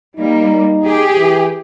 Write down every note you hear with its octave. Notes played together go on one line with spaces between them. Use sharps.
G3 A#3 D#4
G4 G#4
E3